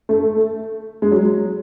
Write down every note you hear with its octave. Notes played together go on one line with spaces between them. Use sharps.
A3
G#3
F#3